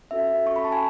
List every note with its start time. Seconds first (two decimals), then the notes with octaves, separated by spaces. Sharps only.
0.11 C#4 F#4 A4 E5
0.46 C#4 F#4 A4 C#6
0.56 B5
0.65 A5
0.72 G#5